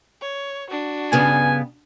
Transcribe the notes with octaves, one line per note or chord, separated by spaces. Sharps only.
C#5
D4 F#4
G2 C#3 B3 G#5